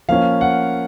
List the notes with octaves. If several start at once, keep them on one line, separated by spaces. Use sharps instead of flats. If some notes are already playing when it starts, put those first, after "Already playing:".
F3 A#3 C#4 F5
F#5